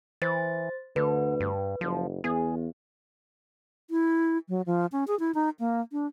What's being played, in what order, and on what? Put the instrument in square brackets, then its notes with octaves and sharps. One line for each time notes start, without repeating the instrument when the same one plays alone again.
[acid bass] E3 [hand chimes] C5 A6
[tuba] D2 [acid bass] D3 [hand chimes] B4
[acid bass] G2
[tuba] F#1 [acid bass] F3
[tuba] E2 [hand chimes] B3 [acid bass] G#4
[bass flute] E4
F#3
F3
C#4
G#4
E4
D#4
A#3
D4